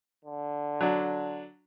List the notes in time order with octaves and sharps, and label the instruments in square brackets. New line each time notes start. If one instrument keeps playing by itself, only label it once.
[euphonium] D3
[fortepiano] F#3 D4